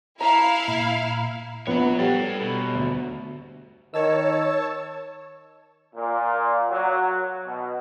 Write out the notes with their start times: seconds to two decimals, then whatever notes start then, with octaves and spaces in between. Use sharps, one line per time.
0.21 E4 F5 A#5
0.68 A#2
1.67 A#1 B3 C#5 F#5
2.00 G3 A4 G5
2.39 B1 B2
2.75 D2
3.94 D#3 C#5 A5 E6
5.95 A#2
6.69 F#3
7.45 B2